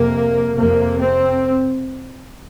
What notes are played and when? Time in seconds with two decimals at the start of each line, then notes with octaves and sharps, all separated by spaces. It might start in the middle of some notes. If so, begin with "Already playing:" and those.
Already playing: F2 C3 A#3
0.53 F2 C3 A#3
0.98 C4